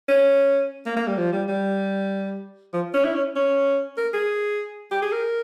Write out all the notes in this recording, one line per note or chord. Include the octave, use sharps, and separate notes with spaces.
C#4
A#3
A#3
G3
F3
G3
G3
F3
C#4
E4
C#4
C#4
A#4
G#4
G4
G#4
A#4